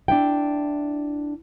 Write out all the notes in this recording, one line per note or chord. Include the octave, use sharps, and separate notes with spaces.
D4 E4 G5